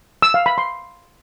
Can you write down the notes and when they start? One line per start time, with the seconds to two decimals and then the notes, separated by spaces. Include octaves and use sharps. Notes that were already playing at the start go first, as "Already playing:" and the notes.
0.22 E6
0.34 F5
0.46 B5
0.58 C6